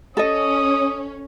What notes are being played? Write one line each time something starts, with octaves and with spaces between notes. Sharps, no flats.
C#4 A4 D#5 D#6